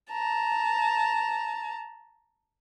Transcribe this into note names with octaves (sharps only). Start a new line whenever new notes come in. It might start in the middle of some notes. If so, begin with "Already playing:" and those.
A5 A#5